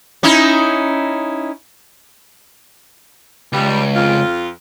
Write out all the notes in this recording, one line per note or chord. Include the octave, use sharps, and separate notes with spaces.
C#4 D#4 E4
C#2 G3
F2 F4